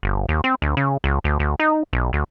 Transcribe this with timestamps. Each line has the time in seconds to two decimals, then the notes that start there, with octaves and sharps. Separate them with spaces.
0.03 G1
0.29 D#2
0.44 C4
0.62 D2
0.77 C#3
1.04 C#2
1.24 D2
1.39 D2
1.60 D#4
1.93 B1
2.13 D2